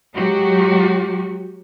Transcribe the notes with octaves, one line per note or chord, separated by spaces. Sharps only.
F#3 G#3 F#4 G4